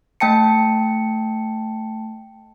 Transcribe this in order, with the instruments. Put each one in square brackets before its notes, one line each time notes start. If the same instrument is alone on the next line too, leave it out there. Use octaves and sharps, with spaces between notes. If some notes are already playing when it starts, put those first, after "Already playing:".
[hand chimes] A3 G5 A5 C#7